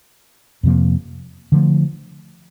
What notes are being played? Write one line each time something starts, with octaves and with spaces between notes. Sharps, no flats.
F2 C3 F3 A#3
D3 F3 A3